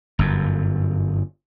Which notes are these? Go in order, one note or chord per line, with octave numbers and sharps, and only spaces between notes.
G1 F#2